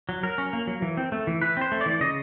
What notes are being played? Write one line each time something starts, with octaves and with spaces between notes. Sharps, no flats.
F#3
F#3 A#4
C#4
A#3
F#3
E3
C4
A3
E3
E3 B4
C4 C5
A3
D5
E3
C#3 D#5